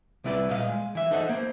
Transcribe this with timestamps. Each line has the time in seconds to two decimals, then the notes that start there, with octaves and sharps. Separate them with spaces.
0.24 C2 G3 E4 B4 D5
0.50 A#2 D#5 F5
0.68 G#3
0.95 E3 E5
1.11 D#4 A4 C5 D#5 F#5
1.29 A#3 C5